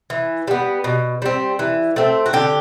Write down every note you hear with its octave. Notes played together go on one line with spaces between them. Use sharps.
E3
G3 B3
B2
G3 C4
E3
A3 C4
F#4
D3 G4